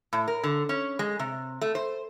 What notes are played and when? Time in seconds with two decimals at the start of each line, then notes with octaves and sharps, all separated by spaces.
0.13 A2
0.28 A#4
0.43 D3
0.69 C#4
0.99 G#3
1.19 C3
1.61 A3
1.75 C5